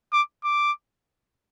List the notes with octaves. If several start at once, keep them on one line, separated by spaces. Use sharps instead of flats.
D6
D6